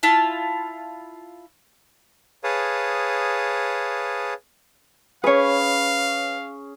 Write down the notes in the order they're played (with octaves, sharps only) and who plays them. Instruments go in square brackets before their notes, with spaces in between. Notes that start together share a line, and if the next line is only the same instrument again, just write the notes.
[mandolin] E4 F4 A5
[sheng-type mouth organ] G#4 B4 C#5 F5 A5 D#6
[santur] C#4 G#4 [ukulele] B4 C#5 [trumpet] F5